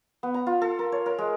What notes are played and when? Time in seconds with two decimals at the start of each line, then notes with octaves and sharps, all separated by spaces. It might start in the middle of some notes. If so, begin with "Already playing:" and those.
0.23 B3
0.34 A#5
0.47 F4
0.62 A4
0.79 A#4
0.92 C#5
1.06 A#4
1.18 G#3